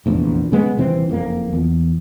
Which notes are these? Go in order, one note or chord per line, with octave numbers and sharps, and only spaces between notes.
F1 A#1 E2
C#3 G#3 B3
D#1 C3 E3 C4
F#1 F2 A#3
E2